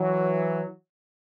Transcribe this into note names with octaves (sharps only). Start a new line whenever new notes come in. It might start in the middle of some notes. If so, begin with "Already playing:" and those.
Already playing: E3 F#3